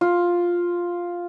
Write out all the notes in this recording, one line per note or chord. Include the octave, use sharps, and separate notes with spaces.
F4